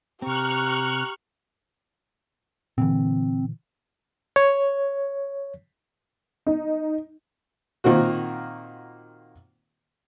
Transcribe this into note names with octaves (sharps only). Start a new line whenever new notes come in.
C3 C4 G4 A#5 C#6 F6 F#6
A#2 D3 E3 C4
C#5
D#4
A#2 D#3 A#3 C4 F#4